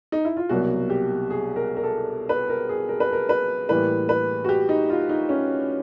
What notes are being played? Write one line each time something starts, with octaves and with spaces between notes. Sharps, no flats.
D#4
E4
F4
C2 B2 F#3 A#3 F#4
G4
G#4
A#4
A#4
A4
B4
A#4
G#4
A#4
B4
A#4
B4
A2 E3 G3 A#3 B4
B4
F#4
G4
D#4
F4
D#4
C#4